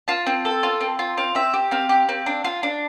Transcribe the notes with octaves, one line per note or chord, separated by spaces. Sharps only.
F4 A5
C4
A4
F4
C4
F4
C4 F5
C4 E5
G4
C4 F5
G4
C4
D4
F4
D4